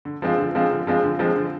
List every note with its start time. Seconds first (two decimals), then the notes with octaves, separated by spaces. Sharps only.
0.05 D3
0.22 F3 G#3 C4 F4
0.38 D3
0.55 F3 G#3 C4 F4
0.71 D3
0.87 F3 G#3 C4 F4
1.03 D3
1.19 F3 G#3 C4 F4
1.36 D3